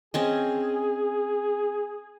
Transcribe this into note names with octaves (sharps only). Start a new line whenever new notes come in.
C4 C#4 G#4 D#5